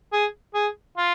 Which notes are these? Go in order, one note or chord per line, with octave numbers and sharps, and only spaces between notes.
G#4
G#4
F4